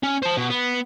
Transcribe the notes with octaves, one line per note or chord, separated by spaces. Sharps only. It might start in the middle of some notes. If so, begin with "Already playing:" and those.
C#4
C5 A5
B2
B3